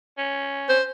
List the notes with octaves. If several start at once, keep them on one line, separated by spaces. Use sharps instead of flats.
C#4
C5